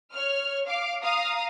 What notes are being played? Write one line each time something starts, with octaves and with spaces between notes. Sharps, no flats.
C#5 F6
F5 D6
F5 A#5 D#6